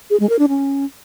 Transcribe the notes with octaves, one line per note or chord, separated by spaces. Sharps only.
G#4
G#3
A#4
D4
C#4